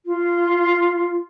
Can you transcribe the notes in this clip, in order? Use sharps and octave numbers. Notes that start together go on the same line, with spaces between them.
F4